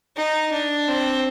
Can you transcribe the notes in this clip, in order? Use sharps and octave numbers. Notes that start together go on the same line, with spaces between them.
D#4
D4
C4